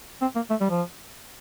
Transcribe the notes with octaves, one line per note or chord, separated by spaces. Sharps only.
C4
A#3
A3
G3
F3